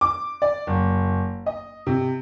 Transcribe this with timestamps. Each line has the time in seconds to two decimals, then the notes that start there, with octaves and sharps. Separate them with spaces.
0.01 D6
0.42 D5
0.67 F#1
1.46 D#5
1.87 C3